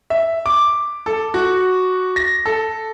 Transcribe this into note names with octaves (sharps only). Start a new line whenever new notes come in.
E5
D6
A4
F#4
A#6
A4